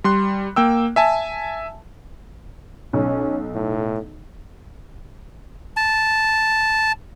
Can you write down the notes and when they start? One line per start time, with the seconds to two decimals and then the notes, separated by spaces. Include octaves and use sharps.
0.04 G3 C6 F#6
0.56 A#3 G5 E6
0.96 E5 G#5 A5
2.93 B1 C#4
3.55 A2
5.77 A5